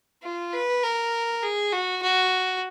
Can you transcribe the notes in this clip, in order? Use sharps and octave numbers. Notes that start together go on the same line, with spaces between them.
F4
B4
A#4
G#4
F#4
F#4